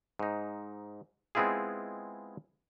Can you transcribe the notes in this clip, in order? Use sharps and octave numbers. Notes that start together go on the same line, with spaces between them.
G#2 D#4
G#3 B3 C4 E4 F4 G#4